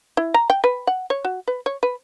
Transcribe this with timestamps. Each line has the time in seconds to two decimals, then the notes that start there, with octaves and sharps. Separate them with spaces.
0.17 E4
0.34 A#5
0.50 G5
0.64 B4
0.87 F#5
1.10 C#5
1.25 F#4
1.48 B4
1.66 C#5
1.83 B4